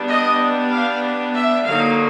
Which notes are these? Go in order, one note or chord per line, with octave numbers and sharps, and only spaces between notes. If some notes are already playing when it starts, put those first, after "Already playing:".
Already playing: G3 B3 D4
D#5
F5
E5
D3 F#3 A#3 D#4 F5